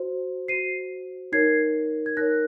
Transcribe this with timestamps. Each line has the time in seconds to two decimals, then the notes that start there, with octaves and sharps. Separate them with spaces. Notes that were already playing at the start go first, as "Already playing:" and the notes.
Already playing: F#4 C5
0.48 F#4 C5 C7 D#7
1.32 D#4 A#4 C#5 G#6 C7
2.06 G#6
2.17 D#4 A#4 C#5 F#6 A#6